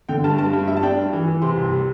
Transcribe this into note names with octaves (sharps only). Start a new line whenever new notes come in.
D3 G5
G2 A5
G2 A5
G2
G3 E5
A5
D4 G5
G2
E3
E3
C3 C6
C2
G3